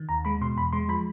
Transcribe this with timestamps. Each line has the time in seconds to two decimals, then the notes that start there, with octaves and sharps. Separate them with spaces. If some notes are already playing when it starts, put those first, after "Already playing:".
Already playing: D#3
0.09 D#2 A#5
0.25 G#3 B5
0.41 B2 C6
0.57 E2 B5
0.73 G#3 C6
0.89 F3 B5